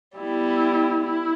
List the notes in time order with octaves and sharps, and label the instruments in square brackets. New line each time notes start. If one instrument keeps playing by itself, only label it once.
[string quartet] G3 B3 E4
E4